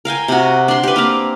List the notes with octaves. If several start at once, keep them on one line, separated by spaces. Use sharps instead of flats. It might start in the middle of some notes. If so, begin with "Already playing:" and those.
A#4 F5 G5 G#5
C3 F#4
D4 C6
G4 B4
A#3 C4 F5